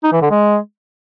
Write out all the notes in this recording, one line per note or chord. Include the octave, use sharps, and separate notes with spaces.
D#4
E3
D3
G#3